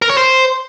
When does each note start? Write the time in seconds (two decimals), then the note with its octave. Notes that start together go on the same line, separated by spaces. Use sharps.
0.02 A#4
0.10 C#5
0.17 C5